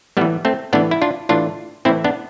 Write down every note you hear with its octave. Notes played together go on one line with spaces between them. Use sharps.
A2 E3 G3 B3
A3 C4
A2 E3 B3 D4
E4
D4 F4
A2 E3 D4 F4
A2 E3 C4 E4
B3 D4